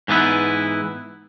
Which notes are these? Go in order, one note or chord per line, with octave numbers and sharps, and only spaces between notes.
G#2 E3 B3 E4